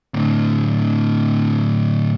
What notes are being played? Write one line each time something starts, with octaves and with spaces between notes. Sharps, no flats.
A2 D3